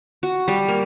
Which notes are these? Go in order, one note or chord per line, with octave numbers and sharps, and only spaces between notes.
F#4
G3
A#3